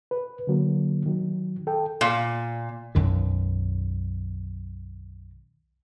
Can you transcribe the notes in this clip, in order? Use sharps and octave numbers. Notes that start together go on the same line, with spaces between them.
B4
D3 F#3 A#3
D#3 F#3
A4 G5
A#2
B1 F#2 D#3